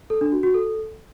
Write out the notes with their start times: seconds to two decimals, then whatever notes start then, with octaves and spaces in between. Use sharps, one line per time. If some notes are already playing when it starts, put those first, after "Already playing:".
0.10 A4
0.21 D4
0.32 F#4
0.43 F#4
0.54 A4